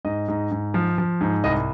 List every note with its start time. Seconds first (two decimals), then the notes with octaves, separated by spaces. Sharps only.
0.05 G#2 D#5
0.28 G#2
0.51 G#2
0.74 F3
0.98 F3
1.21 G#2
1.44 C2 D#5